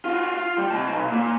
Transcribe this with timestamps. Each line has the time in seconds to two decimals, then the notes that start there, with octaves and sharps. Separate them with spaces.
0.05 F4 F#4
0.36 F4
0.58 G3
0.70 C3 A5
0.89 B1
1.08 A#2 A#3